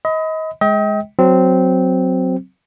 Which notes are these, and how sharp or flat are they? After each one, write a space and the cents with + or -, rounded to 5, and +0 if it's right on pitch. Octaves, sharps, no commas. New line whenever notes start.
D#5 +30 B5 +30
G#3 +0 D#5 +40 G5 +0
F#3 +0 C4 -10